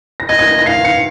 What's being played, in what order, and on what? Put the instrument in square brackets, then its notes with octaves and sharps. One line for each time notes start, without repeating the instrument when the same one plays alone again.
[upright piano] A#6
[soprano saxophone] D#5 [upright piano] G#6
[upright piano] G#6
A#6
A#6
[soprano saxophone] F5 [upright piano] C7
[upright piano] C#7